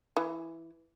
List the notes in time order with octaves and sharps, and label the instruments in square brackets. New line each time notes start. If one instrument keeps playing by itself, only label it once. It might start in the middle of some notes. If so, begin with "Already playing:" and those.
[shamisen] E3